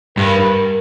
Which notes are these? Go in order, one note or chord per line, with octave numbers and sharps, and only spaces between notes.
G2 A#4